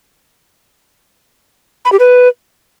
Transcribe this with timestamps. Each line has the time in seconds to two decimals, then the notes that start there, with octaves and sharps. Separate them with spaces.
1.85 B5
1.92 G4
1.99 B4